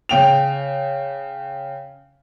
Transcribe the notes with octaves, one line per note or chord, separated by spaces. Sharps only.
C#3 G5 F7